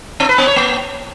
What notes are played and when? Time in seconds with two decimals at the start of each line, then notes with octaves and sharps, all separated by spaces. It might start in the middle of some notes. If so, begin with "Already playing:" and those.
0.20 C4
0.29 B4
0.38 B3
0.47 C#5
0.56 A#3